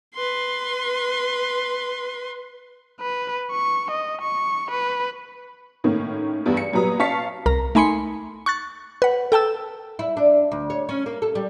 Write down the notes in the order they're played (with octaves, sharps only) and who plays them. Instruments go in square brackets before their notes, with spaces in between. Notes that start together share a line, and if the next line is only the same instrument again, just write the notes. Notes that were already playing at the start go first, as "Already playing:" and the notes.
[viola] B4 C6
[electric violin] B4
C#6
D#5
C#6
B4
[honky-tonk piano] A2 D#3 A#3 C#4
E2 G2 B3
C#7
A#2 F#3 G3 B4 A#5 D#6
C#4 F5 A5 C#6 B6 C#7
[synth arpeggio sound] C2 A#4 A#5
A3 D#4 G#5 B5 C6 C#7
C#6 F#6 A6
B4 F#5
A4 G5 A5 E6
[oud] E4
D4
D2
C#5
C#4
A#3
A4
G3